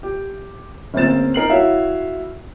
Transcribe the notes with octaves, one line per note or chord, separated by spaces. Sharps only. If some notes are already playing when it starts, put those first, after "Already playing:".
G4
G1 C#3 A#3 C4 A6 E7
D#4 A#4 C7 F#7
E4 F#4 C#5 E5 F5